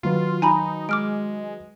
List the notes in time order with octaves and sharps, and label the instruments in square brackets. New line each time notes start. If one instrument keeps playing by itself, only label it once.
[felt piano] D#3 F#3 B4 [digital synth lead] F4
[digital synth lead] D#4 [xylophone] G#5 A#5 B5
[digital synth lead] G#3 [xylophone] D6 F6 D7